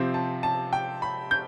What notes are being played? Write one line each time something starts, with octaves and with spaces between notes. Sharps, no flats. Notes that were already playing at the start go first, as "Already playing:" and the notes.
Already playing: C3 F3 C4
A5
A5
G5
B5
G6